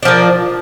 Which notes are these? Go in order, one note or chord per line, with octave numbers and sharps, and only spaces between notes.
F3 A#3 D4